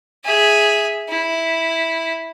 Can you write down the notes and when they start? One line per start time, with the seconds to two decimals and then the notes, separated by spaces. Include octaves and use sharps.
0.25 G#4 E5
1.09 E4